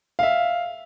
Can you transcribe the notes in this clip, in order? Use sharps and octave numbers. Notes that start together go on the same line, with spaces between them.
E5 F5